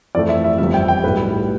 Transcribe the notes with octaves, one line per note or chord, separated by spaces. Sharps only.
F2 E3 A3 D5
E5
E5
G1 F2 C3 G3 E5
G5
G5
B1 A2 G3 B3 B4